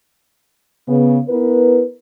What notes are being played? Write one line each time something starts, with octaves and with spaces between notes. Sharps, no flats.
C#3 B3
B3 E4 A#4 B4